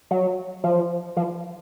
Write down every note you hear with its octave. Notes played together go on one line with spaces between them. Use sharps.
F#3
F3
F3